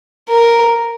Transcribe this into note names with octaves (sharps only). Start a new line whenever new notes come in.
A#4